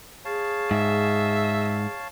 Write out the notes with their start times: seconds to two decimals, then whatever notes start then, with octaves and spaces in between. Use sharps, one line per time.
0.25 G#4 C#5 F5 A5
0.71 G#2 E5